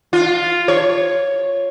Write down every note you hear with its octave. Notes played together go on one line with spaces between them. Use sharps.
F4
C#5